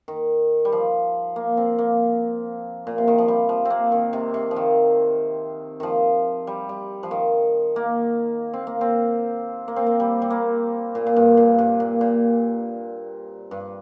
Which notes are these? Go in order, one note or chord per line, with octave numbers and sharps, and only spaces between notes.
D#3
G3
F3
A#3
C4
A#3
A#2
C3
D#3
F3
G3
F3
A#3 C4
D#3
C3
C3
F3
D#3
D#3 F3
G3
G3
F3
D#3
A#3
C4
A#3
C4
A#3
C4
A#3
G3
G3
A#3
A#2
A#2
G2
A#2
G2
A#2
A#2
G2